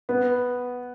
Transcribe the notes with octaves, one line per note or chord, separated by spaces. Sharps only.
B3